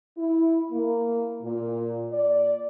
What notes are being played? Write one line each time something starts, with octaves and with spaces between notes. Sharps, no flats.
E4
A#3
A#2
D5